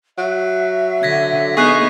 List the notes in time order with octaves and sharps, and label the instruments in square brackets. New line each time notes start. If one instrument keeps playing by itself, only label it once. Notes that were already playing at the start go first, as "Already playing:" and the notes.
[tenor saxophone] F#3 [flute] E5
[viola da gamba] D3 [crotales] G#6 A#6 B6
[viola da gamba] B3 D#4 [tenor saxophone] G#4 [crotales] C#6 F#6 C7